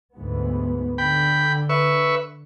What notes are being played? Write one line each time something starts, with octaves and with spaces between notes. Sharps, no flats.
D2 G#2 B3
D3 G5 B5
B4 E5 C#6